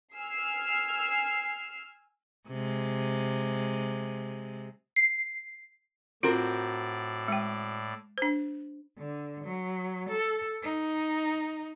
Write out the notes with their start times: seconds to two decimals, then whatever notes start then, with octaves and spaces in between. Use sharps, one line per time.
0.15 G#5 E6 F6 C7
2.49 C3 G#3
4.96 C7
6.23 A2 C4 F4 F#4 A#4 D5
7.28 G#3 G5
8.18 D4 C5
8.98 D3
9.44 F#3
10.09 A4
10.62 D#4